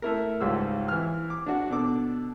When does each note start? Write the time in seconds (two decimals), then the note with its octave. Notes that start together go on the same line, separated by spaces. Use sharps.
0.02 A3 E4 A#4
0.40 C#2 G#2 G3 E6
0.88 E3 F6
1.30 D6
1.46 D4 F#4
1.70 B2 D4 A4 D6